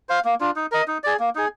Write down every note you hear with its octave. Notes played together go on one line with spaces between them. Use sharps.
C5 F5
A#3
D4 F4
D#4
A#4 D#5
D#4
G#4 D5
A#3
D#4 G#4